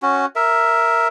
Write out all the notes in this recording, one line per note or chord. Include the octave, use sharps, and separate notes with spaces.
C#4 F#4
A#4 E5